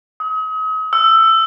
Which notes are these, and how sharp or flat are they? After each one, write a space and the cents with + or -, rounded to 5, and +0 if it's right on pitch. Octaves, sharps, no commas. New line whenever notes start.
D#6 +40
E6 +15